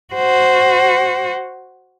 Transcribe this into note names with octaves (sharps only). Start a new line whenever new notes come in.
F#4 C5